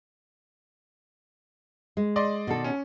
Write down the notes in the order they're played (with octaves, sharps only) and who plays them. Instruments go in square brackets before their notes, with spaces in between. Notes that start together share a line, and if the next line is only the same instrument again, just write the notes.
[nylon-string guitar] G#3
[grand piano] D5 D#5 C6
[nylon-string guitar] B2 D#3 A4
[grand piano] C#4